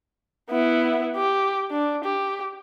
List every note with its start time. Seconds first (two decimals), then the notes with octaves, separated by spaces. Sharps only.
0.51 B3 E4
1.16 G4
1.71 D4
2.05 G4